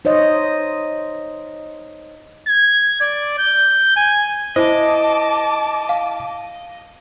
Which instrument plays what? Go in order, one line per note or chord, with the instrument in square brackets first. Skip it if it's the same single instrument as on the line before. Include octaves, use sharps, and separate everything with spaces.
[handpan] D#4 C5 C#5 D#5
[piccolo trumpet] G#6
D5
G6
G#5
[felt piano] E4 [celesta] C5 [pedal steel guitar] D#5 [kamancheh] A5 D6
[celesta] F5